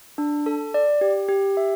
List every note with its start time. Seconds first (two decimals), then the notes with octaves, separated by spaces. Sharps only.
0.18 D4
0.46 A4
0.74 D5
1.01 G4
1.29 G4
1.57 E5